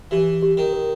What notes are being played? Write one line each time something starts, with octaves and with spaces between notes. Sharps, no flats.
E3 G4
G4
D#3
A#4